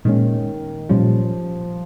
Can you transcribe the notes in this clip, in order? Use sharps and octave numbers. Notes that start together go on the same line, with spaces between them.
A#2 D#3 G#3 C#4
A#2 F3 G3 C#4